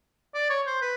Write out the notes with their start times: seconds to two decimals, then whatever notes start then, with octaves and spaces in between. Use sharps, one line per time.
0.34 D5
0.50 C#5
0.66 C5
0.82 B4